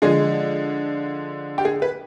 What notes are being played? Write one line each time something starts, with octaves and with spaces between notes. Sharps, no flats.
D3 F3 G#3 G#4
G4
G#4
B4